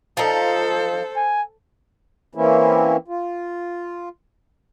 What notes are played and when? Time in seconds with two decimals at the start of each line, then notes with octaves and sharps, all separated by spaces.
0.17 F3 D#4 A4 C5
1.16 G#5
2.35 E3 A#3 C4 C#4 E4
3.08 F4